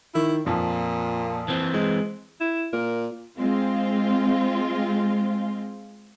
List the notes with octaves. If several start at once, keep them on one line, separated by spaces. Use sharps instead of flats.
D#3 E4
F2 A#2 F3
E3 C4
G#3
E4
A#2 A#4
G#3 C4 F4